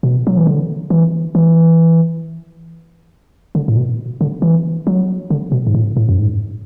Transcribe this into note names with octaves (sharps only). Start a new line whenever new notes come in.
B2
F#3
E3
D3
E3
E3
D3
A2
B2
D3
E3
F#3
D3
B2
G#2
A2
A2
F#2
G#2